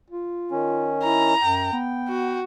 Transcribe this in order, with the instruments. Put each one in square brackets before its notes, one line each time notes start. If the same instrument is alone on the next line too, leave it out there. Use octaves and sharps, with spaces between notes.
[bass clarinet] F4
[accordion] D#3 C#4
[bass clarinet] E4 [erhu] A#5
[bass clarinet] F#2 [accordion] G5
[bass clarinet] B3
[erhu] F#4